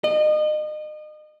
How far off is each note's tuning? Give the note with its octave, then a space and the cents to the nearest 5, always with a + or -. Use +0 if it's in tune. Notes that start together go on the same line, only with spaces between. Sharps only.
D#5 -35